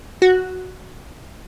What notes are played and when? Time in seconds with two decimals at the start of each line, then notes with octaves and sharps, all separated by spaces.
0.22 F#4